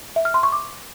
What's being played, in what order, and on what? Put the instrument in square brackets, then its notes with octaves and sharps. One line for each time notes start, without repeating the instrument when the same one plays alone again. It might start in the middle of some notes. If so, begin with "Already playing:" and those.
[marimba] E5
F6
C6
C#6
D6